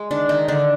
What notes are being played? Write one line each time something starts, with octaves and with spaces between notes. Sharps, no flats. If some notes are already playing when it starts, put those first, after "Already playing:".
Already playing: G#3
D#3 D4
D#3 D#4
D3 D4